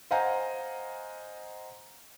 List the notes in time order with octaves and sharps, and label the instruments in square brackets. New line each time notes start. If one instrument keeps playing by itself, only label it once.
[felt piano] C5 D#5 F5 F#5 G#5 A#5